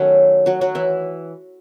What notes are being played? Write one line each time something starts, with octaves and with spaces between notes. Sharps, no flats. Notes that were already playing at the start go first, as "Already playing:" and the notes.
Already playing: D#3 F#3 A3 C#4 F#4
F#3 F#4
F#3 F#4
E3 E4